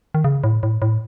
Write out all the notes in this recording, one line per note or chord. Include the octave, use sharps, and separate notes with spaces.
D#3
C#3
A2
A2
A2